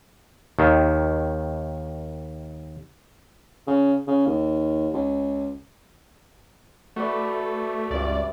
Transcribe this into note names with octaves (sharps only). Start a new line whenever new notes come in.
D#2 D#3
C#3
C#3
D#2
C#2
A3 F#4 B4 D5
C#2 G2 D5 E5